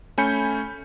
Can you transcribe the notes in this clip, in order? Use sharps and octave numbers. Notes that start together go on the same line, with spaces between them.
A3 C#4 G#5 B5 G6 C#7